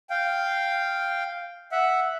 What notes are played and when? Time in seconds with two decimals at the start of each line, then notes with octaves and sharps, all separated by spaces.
0.10 F5 G5
1.72 E5 F#5